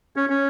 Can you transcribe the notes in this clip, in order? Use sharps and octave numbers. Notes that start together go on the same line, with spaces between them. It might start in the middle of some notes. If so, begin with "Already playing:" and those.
C#4
C#4